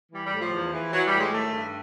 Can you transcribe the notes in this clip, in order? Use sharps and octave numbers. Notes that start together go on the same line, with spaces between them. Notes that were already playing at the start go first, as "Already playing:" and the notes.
E3 G3
G3
A2
F3
E2
E3
E3 F#3
G3
A2
G#3
D#3 A3
G2